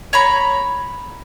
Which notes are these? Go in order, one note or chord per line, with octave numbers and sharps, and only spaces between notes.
C#5 A#5 B5